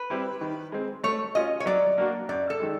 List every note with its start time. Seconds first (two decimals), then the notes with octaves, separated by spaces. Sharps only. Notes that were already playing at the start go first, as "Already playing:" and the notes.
Already playing: B4
0.10 G3 C4 E4 G4
0.41 D#3
0.72 G#3 C4
1.04 A3 C#5
1.35 C#4 F4 D#5
1.60 C#5
1.66 F#3 D5
1.98 A#3 D4 F#4
2.29 F#2 D5
2.50 A4
2.60 D#3 G#3